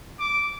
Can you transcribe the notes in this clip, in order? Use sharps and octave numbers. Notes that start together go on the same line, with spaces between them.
D6